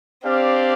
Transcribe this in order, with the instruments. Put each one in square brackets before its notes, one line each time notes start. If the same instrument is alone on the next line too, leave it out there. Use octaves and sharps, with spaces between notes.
[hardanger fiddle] C4 [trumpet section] D4 G4 D5 F5